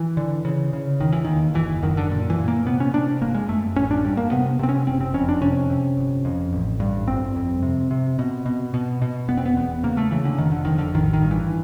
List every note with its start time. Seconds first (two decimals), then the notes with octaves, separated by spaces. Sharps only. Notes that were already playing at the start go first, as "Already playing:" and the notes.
Already playing: E3
0.17 D3
0.45 C#3
0.73 C#3
1.00 E1 D#3
1.13 E3
1.24 D#2 D#3
1.55 F#1 E3
1.82 F#2 D#3
1.97 D3
2.11 A#2
2.30 E3
2.38 A#2
2.48 A#3
2.65 C3 B3
2.80 C#4
2.93 C3 D4
3.21 G1 A#3
3.34 G#3
3.48 F#2 A3
3.76 A1 C#4
3.91 D4
4.05 G2
4.17 A#3
4.31 C3 B3
4.59 C3 C4
4.69 C#4
4.87 F#1 C4
5.01 C4
5.14 F2 C#4
5.29 D4
5.42 C3 C#4
5.70 C3
5.97 G1
6.25 F2
6.53 A1
6.80 G2
7.08 G1 C4
7.36 F2
7.63 C3
7.91 C3
8.19 B2
8.46 B2
8.74 B2
9.02 B2
9.28 F1 B3
9.37 C4
9.46 B3
9.57 E2
9.83 C#3 A#3
9.97 A3
10.11 C#3 E3
10.25 D3
10.38 F1 D#3
10.52 D3
10.65 F2 D#3
10.78 D3
10.94 A1 D#3
11.13 D#3
11.22 G2
11.31 E3